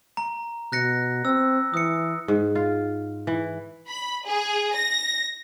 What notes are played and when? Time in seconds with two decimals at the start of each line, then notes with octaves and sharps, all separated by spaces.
0.17 A#5
0.72 B2 F#6 A#6 C#7
1.25 C4 E6
1.74 E3 D#6 C#7
2.28 G#2
2.55 F4
3.27 E3
3.87 B5
4.25 G#4
4.74 A#6